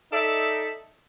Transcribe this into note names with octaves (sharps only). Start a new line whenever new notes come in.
D#4 A4 D5 E5